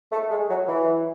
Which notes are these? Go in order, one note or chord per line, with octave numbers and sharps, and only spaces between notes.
A3
G#3
F#3
E3